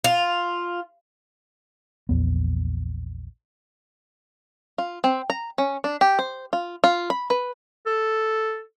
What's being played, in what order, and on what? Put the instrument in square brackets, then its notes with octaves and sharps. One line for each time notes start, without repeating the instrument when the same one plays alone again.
[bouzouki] F4
[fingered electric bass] A#1 E2 B3
[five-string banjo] F4
C4
A#5
C#4
D4
G4
C5
F4
F4
B5
B4
[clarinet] A4